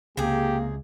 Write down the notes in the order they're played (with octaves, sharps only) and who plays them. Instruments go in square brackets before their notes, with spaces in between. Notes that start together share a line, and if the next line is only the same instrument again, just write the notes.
[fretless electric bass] C#2 [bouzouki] C3 G#4 [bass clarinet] A#3 [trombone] G4